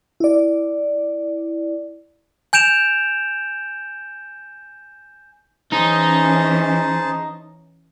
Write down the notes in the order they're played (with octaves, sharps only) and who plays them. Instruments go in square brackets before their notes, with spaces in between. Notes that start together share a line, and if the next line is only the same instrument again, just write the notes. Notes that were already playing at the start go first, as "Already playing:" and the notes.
[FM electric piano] E4 D5
[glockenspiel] G#5 G6 D7 E7 F7
[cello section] E3 C#4 [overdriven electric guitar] D#4 [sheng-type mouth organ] G#4 C5 A5